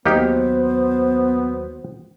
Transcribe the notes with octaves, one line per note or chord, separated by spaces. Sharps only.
D#2 F#3 A#3 B3 D#4 G4 C5